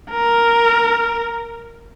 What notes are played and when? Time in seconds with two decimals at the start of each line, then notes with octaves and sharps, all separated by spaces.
0.10 A#4